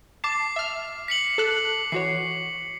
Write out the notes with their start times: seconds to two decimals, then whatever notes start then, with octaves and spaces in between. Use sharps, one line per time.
0.24 A5 D6 C7
0.56 E5 F6
1.08 B6 C#7 F#7
1.38 A4 F#6
1.92 E3 F#4 C#5 C7